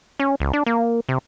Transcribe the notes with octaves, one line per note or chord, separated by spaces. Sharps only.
C#4
C#2
D4
A#3
C3